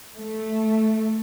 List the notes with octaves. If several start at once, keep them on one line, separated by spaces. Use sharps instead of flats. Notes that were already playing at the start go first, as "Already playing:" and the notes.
A3